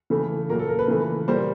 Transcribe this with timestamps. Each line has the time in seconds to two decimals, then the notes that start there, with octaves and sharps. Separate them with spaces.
0.10 C#3 E3 A3
0.49 A#2 F#3 A#3 A#4
0.59 A4
0.69 A#4
0.79 B4
0.88 C#3 E3 A3
1.28 A#2 G3 A#3 C5